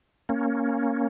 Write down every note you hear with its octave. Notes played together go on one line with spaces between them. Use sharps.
A#3 C#4